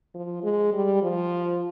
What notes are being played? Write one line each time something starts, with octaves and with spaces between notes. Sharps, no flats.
F3
G#3
G3
F3